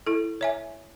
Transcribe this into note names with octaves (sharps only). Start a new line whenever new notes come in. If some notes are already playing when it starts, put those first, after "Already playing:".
E4 A4
C#5 E5 G#5